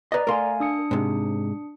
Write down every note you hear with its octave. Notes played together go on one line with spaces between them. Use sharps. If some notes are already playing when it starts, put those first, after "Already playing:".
B4 D5 D#5 A#5
A3 A#4 F5 G#5 C6
D4 D#6 C#7
G#2 C3